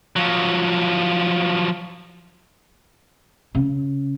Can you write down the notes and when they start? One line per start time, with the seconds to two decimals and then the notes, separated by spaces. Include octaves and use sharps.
0.16 F3 F#3
3.55 C#3 C#4